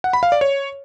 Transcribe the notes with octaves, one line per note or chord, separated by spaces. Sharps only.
F#5
B5
F5
D5
C#5